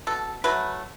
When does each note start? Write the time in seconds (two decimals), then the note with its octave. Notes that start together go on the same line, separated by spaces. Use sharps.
0.07 B2 A4
0.44 F#3 A3 B4